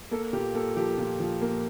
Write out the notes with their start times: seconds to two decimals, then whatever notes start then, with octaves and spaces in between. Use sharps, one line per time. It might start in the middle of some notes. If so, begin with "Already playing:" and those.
0.11 A#3 A4
0.33 A#2 G4
0.54 A#3 A4
0.76 F3 G4
0.98 A#2
1.20 F3
1.41 A#3